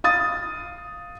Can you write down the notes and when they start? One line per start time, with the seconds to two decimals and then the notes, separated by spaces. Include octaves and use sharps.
0.04 F5 D#6 A6